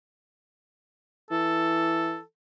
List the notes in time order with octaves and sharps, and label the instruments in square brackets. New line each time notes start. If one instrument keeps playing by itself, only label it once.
[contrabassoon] E3 [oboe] A4